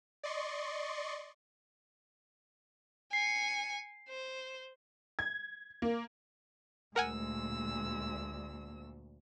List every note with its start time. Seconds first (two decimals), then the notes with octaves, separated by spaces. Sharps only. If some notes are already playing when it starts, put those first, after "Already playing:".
0.23 D5 D#5 C6 C#6
3.13 G#5 C7 C#7
4.09 C5
5.19 G#6
5.82 A#3
6.96 D2 A#2 G#3 A#4 F#5 G#5 E6